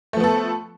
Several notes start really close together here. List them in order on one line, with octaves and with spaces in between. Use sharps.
A3 F3 B3 A4